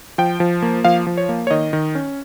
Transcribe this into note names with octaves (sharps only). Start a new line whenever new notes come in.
F3 G5
F3
A#3
F3 F5
F3
C#5
A#3
C#5
D#3 D#5
D#3
C#4